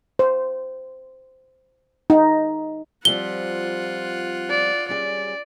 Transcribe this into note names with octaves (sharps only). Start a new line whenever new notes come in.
C5
D#4
F3 G3 C4 F4 F#5 G7
D5
G3 C#4 G#4 D5